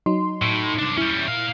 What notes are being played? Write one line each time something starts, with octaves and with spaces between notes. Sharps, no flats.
F#3 D#4 C6
A2
C2 D4
G3 C#4 E4
A#2 F5